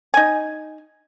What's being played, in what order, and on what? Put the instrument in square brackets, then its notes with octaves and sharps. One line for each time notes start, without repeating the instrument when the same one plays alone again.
[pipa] D#4 G#5